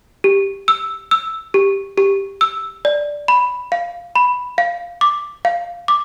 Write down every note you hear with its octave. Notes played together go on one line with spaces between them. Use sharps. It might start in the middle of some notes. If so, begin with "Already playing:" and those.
G4
E6
E6
G4
G4
E6
D5
B5
F5
B5
F5
D6
F5
D6